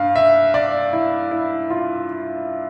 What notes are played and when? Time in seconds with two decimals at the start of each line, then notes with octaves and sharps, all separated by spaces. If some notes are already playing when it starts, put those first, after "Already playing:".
Already playing: G2 F5
0.16 E5
0.54 D5
0.93 E4
1.31 E4
1.70 F4